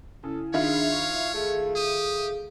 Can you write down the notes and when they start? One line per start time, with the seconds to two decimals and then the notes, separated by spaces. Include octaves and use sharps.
0.24 C#3 E4 A4
0.54 D#3 D4 E4 F4 G#4 C#5 F5
0.92 C#6
1.34 A3 G#4 A4 F5
1.76 G4 D#6